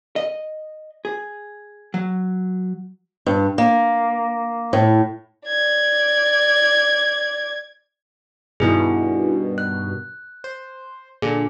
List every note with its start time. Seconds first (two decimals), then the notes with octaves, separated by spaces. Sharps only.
0.16 D#5
1.05 G#4
1.94 F#3
3.26 G2
3.58 A#3
4.73 A2
5.47 D5 G#6
8.60 G2 B2 D#3 E4 G#4
9.58 F#6
10.44 C5
11.22 A#2 D3 G#4